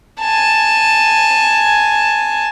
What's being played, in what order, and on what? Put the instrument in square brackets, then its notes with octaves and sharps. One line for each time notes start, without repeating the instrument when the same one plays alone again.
[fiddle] G#5 A5